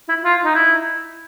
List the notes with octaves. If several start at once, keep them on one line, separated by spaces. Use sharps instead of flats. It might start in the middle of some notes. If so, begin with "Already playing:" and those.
E4
F4
D#4
E4